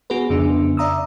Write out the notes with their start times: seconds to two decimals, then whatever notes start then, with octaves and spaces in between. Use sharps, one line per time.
0.10 B3 F#4 G#4 B4
0.30 F2 C#3 B3 D4
0.77 D5 E5 A#5 D#6 E6